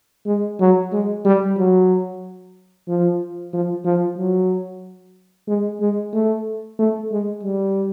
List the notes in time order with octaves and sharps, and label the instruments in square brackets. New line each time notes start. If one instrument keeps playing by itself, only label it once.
[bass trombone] G#3
F#3
G#3
G3
F#3
F3
F3
F3
F#3
G#3
G#3
A3
A3
G#3
G3